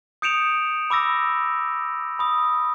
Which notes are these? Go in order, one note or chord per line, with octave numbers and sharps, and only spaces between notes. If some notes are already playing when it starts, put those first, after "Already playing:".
D#6 G6 C#7 D7 E7 F7
B5 D6 E6 A#6
B5 D#6